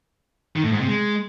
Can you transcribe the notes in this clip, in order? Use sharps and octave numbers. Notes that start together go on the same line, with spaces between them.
D#3
A2
G#2
C3
G#3